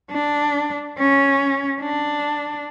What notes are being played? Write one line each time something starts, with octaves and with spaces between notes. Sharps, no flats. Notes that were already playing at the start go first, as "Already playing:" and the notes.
D4
C#4
D4